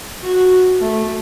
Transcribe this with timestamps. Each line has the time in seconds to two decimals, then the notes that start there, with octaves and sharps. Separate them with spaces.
0.23 F#4
0.81 A3